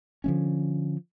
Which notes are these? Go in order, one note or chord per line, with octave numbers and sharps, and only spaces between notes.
D3 F3 A3 C#4